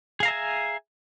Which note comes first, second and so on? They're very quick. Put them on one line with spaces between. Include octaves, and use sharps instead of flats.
G#4 F5 A#5 E5 G#5